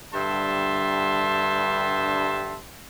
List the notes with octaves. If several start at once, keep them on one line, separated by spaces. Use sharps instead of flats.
G2 D3 G3 E5 A5 C6